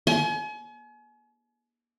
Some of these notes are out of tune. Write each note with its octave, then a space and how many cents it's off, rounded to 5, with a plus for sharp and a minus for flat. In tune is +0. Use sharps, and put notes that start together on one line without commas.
G#5 +40